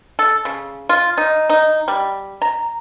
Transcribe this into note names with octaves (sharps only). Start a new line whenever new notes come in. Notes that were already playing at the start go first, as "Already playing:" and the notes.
A4
C#3
F4
D#4
D#4
G3
A#5